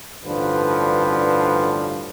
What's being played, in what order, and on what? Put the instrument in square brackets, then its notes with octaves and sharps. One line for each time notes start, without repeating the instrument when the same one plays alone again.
[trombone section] A1 G2 D3 F3 B4